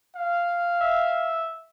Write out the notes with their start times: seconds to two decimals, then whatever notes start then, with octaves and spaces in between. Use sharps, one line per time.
0.16 F5
0.81 E5